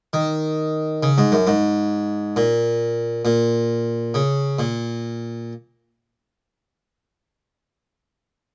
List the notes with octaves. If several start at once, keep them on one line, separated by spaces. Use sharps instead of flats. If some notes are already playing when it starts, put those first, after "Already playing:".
D#3
C#3
G#2
F#2
G#2
A#2
A#2
C#3
A#2